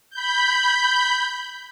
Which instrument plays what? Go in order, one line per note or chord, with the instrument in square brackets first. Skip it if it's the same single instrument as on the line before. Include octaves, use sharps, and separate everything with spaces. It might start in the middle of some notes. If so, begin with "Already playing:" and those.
[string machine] B5 G6